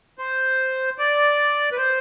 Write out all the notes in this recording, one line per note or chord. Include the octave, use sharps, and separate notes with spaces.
C5
D5
B4
C5